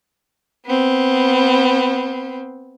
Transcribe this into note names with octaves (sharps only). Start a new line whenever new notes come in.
B3 C4